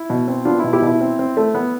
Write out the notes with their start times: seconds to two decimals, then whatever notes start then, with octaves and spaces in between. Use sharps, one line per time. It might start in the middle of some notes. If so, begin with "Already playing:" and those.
Already playing: E4
0.10 B2
0.28 C4
0.45 B3 D4 F4
0.60 B2 E4
0.73 E4 G4
0.82 B2
0.87 E4
1.01 C4
1.19 C4
1.37 A3
1.55 B3